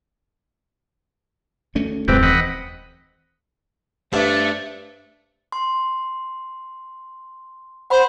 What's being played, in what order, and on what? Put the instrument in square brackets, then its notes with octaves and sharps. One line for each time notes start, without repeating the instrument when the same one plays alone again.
[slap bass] D2 A3 C#4
[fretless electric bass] D#1 [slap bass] F#2 A2 G#3 [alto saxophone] C4 [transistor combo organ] G4 B4
[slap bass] E3 [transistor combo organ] D#5 F#5 B5
[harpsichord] G2 [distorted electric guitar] A3 [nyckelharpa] D4 [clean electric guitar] C5 E5
[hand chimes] C6
[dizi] C5 [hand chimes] F#5 B5 C6